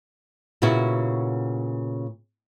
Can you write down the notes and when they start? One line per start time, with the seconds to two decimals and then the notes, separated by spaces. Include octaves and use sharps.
0.62 A#2 C#3 B3 E4 F#4